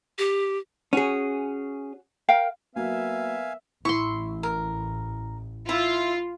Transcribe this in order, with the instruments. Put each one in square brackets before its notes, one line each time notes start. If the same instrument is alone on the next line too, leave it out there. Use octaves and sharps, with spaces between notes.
[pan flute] G4
[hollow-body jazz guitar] C#4 G#4 [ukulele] F#4
[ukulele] A#4 F5 G5
[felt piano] F#3 A#3 [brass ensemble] B3 A#4 E5 [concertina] F5 G#5
[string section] A1 [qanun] E4 C6 [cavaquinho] C#6
[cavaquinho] A#4
[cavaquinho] E4 [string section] F4